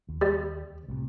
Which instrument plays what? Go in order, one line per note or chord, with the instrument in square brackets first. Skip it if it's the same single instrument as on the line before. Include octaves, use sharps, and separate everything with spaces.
[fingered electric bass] D#2
[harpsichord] G3
[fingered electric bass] C2 A2 C3